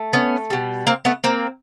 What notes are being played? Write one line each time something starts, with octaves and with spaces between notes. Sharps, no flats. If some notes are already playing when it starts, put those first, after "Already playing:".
Already playing: A3
B3 C#4
B2 G3
A#3 C4
A3 B3
A#3 C4